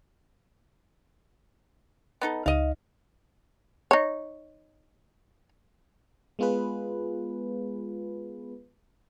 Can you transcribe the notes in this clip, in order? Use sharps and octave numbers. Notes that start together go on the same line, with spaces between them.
B3 D#4 A4
C#2 D#4 D#5 F5
D#4 C#5
G#3 B3 F4 G#4 B4